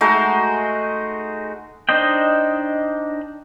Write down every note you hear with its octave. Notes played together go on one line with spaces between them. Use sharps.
G#3 A3 D#4 F#4
D4 D#4 C5 D#5 G5